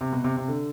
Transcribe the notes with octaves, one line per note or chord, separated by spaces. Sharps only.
C3
B2
C3
C3
D3